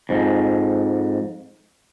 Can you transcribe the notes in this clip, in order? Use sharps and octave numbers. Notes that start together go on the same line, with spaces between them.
F2 G#2